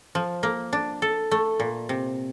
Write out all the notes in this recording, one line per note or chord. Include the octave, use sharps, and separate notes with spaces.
F3
A#3
D4
A4
A3
A#2
C3